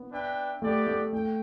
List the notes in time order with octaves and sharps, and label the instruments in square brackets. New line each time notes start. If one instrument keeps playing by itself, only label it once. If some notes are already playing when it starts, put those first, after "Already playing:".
Already playing: [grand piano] B3
[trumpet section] D4 B4 E5 G5
[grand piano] A3 [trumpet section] B3 G4 D5 G5
[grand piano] A3
[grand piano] A3 [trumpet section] G5